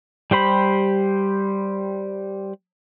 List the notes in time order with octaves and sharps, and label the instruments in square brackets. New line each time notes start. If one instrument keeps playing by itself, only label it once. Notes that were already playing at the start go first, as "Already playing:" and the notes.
[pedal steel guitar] G3 G4 C5 B5